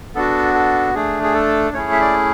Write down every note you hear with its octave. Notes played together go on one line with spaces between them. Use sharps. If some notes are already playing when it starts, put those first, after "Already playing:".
B3 D4 F#4 A4
A4
A3 D4 G#4
G#4
A4
A3 C#4 E4 G#4 C#5
E5
D5